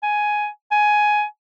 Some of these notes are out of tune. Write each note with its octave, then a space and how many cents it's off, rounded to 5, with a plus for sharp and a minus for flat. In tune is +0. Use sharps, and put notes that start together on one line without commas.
G#5 +10
G#5 +10